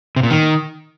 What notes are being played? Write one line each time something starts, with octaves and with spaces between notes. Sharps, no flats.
C3
A#2
D#3